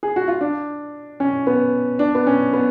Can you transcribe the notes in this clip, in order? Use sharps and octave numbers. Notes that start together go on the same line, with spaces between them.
G#4
F#4
F4
D4
C#4
B3
D4
B3
C#4
B3